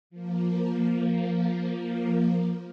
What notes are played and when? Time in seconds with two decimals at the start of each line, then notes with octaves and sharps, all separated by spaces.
0.10 F3 A#3